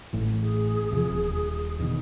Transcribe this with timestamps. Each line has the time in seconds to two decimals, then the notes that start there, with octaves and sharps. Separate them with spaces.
0.13 A1 A2 E3
0.42 G#4
0.91 E2 C3 F3
1.10 D#1
1.79 E2 B2 D#3